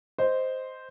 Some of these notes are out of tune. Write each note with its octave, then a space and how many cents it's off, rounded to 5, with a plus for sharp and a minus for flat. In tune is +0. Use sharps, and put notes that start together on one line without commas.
C5 -5 D#5 +0